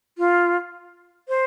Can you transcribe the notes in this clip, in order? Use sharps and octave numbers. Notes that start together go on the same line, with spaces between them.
F4
C5